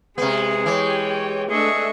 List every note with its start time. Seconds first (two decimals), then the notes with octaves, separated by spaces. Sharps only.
0.18 C3 G#3 B3 G#4
0.66 E3 G4 C#5 G5
1.50 A3 D4 G#4 D#5 E5 C#6